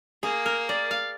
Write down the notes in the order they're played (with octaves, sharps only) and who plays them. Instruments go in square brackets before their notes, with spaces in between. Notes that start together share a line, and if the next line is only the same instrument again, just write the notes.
[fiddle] A#3 [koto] G#4
[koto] A#4
D5
F5